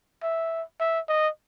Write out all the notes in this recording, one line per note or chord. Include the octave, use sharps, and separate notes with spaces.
E5
E5
D#5